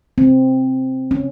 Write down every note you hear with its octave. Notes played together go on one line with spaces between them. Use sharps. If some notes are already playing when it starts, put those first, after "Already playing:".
C4
C#4